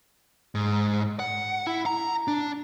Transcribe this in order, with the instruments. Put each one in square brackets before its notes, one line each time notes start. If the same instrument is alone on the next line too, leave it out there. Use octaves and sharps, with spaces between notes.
[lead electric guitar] G#2
F#5
E4
A#5
D4